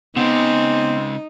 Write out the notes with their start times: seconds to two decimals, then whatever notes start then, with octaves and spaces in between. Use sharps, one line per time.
0.16 C#3 G#3 B3 C4 D#4